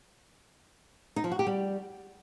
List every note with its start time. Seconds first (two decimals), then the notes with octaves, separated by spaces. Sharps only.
1.16 D#4
1.24 F3
1.31 F#4
1.39 G4
1.47 G3